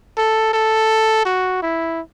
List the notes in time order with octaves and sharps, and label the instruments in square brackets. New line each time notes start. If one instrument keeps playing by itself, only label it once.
[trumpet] A4
A4
F#4
E4